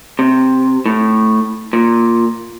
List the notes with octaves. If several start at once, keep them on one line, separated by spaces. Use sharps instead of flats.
C3
A2
A#2